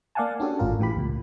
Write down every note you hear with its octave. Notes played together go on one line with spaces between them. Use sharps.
A#3 D5 F5 F#5 G#5 A5
C#4 D4 F#4 G4 A4
G#1 A2 F4 A#4
A2 E3 G4 B5
C#2 A#2